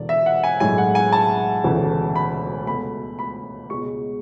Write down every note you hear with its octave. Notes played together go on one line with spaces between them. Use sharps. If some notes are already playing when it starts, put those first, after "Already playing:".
Already playing: E1 E2 D3 D5
E5
F#5
G#5
B1 A2 G#3 G#5
F#5
G#5
A5
E1 D2 C#3 E3 A3
B5
C#2 B2 A3 B5
B5
C#2 B2 G#3 C#6